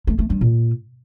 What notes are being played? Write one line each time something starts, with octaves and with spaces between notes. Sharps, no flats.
A3
A3
G2
A#2